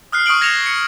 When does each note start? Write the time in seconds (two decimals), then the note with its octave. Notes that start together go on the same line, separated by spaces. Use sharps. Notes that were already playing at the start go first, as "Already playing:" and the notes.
0.12 D#6 F6 F#6 C7
0.26 C#6 D#6 F6 F#6 D7 F#7
0.41 D#6 G#6 A#6 C#7 E7 F7
0.66 C#7